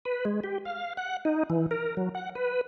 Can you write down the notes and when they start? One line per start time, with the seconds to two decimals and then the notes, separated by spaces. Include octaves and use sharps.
0.05 B4
0.25 G#3
0.44 G4
0.65 F5
0.97 F#5
1.25 D#4
1.50 E3
1.71 A#4
1.97 F#3
2.15 F#5
2.35 B4